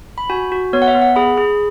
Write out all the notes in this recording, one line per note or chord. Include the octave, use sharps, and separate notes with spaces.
B5
F#4 G#5
F#4
B3 C#5
F#5
E5
B3
F#5
G#4 B5
G#4